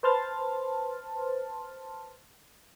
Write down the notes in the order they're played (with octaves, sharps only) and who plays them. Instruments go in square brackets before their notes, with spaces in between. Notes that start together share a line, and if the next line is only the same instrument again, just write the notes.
[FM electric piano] B4 C5 A5 C6 F6 A6